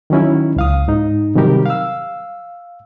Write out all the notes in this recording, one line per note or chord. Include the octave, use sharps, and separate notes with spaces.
D#3 F#3 C#4 E4
C#2 F5 D#6
G#2 D#4
C3 D#3 F#3 G3 G4 A#4
F5 E6